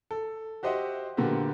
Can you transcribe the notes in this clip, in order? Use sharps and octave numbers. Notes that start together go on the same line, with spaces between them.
A4
F#4 G4 C5 D#5 E5 F#5
A#2 D3 A#3 B3 F#4 G4